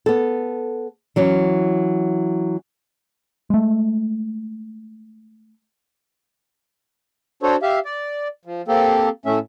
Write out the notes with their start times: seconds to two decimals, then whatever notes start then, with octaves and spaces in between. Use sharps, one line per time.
0.06 B3 A4
1.16 E3 F#3 C#4
3.50 G#3 A3
7.43 D4 F#4 A4 C5 C#5
7.62 G4 E5 F5
7.85 D5
8.45 F3
8.68 A#3 C4 G4 A4
9.26 A2 A3 C#4 E5